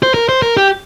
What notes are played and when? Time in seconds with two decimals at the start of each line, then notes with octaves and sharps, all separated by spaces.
0.03 C5
0.14 A#4
0.29 C5
0.42 A#4
0.57 G4